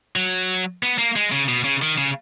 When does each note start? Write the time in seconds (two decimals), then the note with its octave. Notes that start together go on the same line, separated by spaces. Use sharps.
0.16 F#3
0.83 B3
0.98 A#3
1.16 G#3
1.32 C#3
1.49 B2
1.64 C#3
1.82 D#3
1.98 C#3